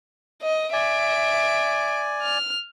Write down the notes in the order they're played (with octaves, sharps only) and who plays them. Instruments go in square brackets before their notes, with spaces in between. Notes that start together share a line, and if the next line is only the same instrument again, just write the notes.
[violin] D#5
[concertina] D5 G#5 [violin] E5 D7
[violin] F6